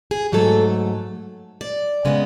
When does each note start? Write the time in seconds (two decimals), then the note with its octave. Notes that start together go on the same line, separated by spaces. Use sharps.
0.11 G#4
0.32 G#2 F#3 A3 A4
1.61 D5
2.05 C#3 G#3 B3